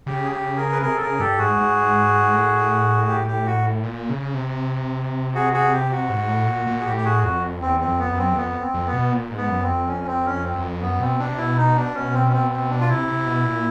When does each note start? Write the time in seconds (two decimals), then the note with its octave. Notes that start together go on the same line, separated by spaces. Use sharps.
0.06 C#3 G4
0.24 G#4
0.31 G4
0.56 G#4 A#4
0.72 B4
0.82 C3 G#4 A#4
0.97 A4
1.01 C#3 G#4 A#4
1.19 G2 G4 A4
1.38 G#2 F#4 G#4
1.57 G#2
2.33 A2
3.08 G4
3.27 G4
3.46 F#4
3.84 A#2
4.10 C#3
4.34 C3
5.34 F#4 G#4
5.53 F#4 G#4
5.72 G4
5.91 F#4
6.10 G#2
6.29 A2
6.47 A#2
6.67 A#2
6.80 G#4
6.85 A2 G4
6.97 G4
7.05 F#4 G#4
7.24 F2 F#4
7.60 E2 C4
7.80 C4
7.86 F2
7.99 B3
8.12 F#2
8.18 C4
8.33 E2
8.37 F2 B3
8.61 C4
8.74 F2
8.87 B3
8.94 B2
9.12 A#2
9.31 G#2
9.37 B3
9.49 F#2
9.62 C4
9.68 F2
9.87 C#4
10.07 C4
10.25 C#4
10.44 C4
10.54 F#2
10.62 F2
10.82 F#2 B3
11.00 B2 C4
11.19 B2 D4
11.29 C3
11.38 B2 E4
11.57 D#4
11.76 D4
11.95 C#4
12.14 C4
12.25 C#4
12.32 C4
12.51 C4
12.70 D4
12.81 F4
12.88 C3 E4
13.08 C3
13.26 B2
13.45 A#2